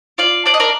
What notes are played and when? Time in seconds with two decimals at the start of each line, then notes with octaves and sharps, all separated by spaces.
0.18 F4 D5 F5
0.46 D4 D5
0.54 D#5
0.60 A#4 D5